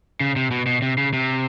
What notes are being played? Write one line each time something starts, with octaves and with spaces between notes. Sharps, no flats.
C#3
C3
B2
B2
C3
C#3
C3